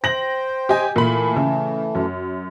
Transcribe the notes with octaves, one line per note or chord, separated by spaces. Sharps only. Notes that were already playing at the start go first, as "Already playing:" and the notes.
C5 G5 A#6 F#7
G4 D#5 G#5
A#2 E3 A3 B5
C#3
F#2